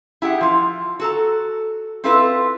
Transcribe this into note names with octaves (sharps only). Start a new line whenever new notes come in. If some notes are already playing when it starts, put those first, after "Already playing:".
E4 G4 G#4 F#5
F3 F4
F#4 A4 A#5
C4 E4 F4 A4 B4